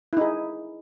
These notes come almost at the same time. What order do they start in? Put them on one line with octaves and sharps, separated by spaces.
E4 D#4 G#4